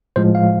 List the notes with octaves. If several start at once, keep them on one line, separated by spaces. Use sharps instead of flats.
A2 F3 G#3 C5
F5